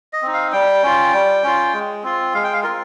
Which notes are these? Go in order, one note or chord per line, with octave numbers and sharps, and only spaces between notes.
D#5
C4 D#4
F5
G3 G5
C#4 F4
G3
C#4 F4
G#3
C4 F4
G#3 F5
G5
F5
C4 F4 A#4